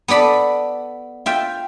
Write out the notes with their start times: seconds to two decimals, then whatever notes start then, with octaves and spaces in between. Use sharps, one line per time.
0.08 B3 A4 D5 B5
1.26 F4 E5 G5